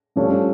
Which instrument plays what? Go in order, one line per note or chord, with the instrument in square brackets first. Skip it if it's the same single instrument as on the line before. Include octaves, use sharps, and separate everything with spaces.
[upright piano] G2 F3 A3 D4 G4 [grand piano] C#4